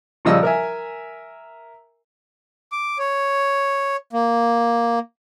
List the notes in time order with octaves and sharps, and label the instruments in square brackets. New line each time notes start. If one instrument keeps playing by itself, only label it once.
[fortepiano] A#1 C#3 F3 G3 D#5 E6
A#4 E5 G#5
[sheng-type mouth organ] D6
C#5
A#3